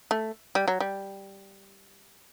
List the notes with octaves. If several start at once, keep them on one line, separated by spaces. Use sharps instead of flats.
A3
G3
F#3
G3